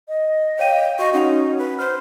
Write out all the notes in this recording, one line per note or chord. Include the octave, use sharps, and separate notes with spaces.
D#5
C#5 F5 G5 D#7
F#4 D#5 F5 C#6
C#4 D#4 F#4 F#5 F7
B4
C5 F6